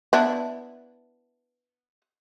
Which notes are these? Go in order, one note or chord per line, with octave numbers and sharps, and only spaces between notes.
B3 D4 E4